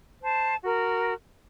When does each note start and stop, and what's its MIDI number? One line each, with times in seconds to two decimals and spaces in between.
0.22 0.55 72
0.22 0.55 81
0.63 1.14 66
0.63 1.14 70